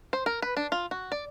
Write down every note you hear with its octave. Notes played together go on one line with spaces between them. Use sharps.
C5
A#4
B4
D4
F4
F#4
D5